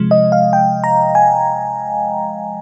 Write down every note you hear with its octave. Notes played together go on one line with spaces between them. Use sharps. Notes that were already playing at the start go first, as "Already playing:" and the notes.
Already playing: C3 F3 G#3
D#5
F5
G5
A#5
G#5